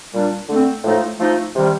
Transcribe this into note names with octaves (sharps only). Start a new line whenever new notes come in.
A#2 G3 D4
D3 A3 C4
A2 F3 A3 D#4
F3 A3 D#4
C3 D#3 G3